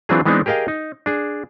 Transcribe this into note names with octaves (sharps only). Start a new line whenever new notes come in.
E3 F#3 C4 D4 F4 G#4
E3 G#3 B3 C4 D4 D#4
G4 G#4 A#4 D#5 F5 G5
D#4
D4 G#4